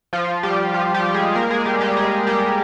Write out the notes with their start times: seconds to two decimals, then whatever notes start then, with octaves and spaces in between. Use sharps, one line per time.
0.13 F3 F4
0.43 G3 G4
0.74 F3 F4
0.94 G3 G4
1.14 G#3 G#4
1.35 A#3 A#4
1.50 G#3 G#4
1.66 G3 G4
1.81 G3 G4
1.96 G#3 G#4
2.27 G3 G4